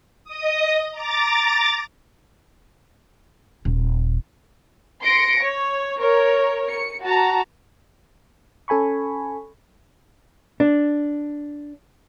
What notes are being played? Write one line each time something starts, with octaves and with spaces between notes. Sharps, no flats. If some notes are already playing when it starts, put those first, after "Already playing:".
D#5 D#6
A#5 D6 A6
D#1
C6 A#6 C#7 D7
C#5
A#4 C#5
C#7
F#4 A5 A#5
C#4 A4 G#5 B5 C#6
D4